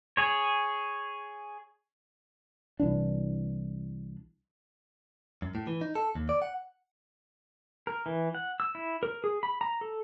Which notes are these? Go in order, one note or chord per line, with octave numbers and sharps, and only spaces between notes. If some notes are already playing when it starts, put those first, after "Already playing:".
G#4 C#5
C2 E3 D4
F#2
A2
E3
D#4
A4
D#2
D5
F#5
A#4
E3
F#5
E6
E4
A#4
G#4
B5
A#5
A4